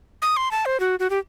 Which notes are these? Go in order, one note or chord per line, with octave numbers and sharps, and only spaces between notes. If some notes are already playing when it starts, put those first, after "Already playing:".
D#6
C6
A5
C5
F#4
F#4
G4